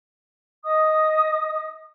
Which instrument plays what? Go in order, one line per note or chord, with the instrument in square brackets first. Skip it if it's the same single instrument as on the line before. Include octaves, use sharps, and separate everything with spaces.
[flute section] D#5 D#6